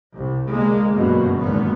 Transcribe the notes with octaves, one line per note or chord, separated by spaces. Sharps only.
C2
C2 D3 G#3 A#3
G1 F#2 B2 A#3
G#1 A#2 B3